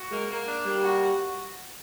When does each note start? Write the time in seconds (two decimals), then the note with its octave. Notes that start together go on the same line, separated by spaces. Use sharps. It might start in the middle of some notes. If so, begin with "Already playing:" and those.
Already playing: F#4
0.11 G#3 A#3
0.30 A#3
0.48 D4
0.65 G3 A#3
0.84 F#4
1.02 F#4